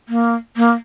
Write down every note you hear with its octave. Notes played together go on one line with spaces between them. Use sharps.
A#3
A#3